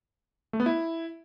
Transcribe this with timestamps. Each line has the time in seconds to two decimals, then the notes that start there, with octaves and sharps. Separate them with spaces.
0.53 A3
0.60 B3
0.66 E4